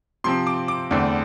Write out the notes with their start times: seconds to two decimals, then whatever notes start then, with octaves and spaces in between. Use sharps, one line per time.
0.24 C3 F3 C4 C6
0.47 D6
0.68 D6
0.91 E2 D3 A3 C4